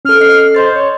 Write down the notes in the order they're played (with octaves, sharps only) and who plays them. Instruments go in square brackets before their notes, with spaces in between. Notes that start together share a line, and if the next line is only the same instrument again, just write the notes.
[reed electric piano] C#4 A4 [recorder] F6
[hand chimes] D#5 C7
[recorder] C5 [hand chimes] D#5 C6 A6
[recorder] C#5